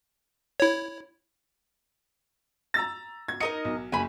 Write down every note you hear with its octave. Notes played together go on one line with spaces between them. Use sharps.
E4 C#5
A#5 E6 A6
G#6
D#4 A#4 D#5 C#7
B1
F#1 G#5 B5